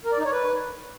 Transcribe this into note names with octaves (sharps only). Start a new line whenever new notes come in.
A#4
D5
D#4
C#5
B4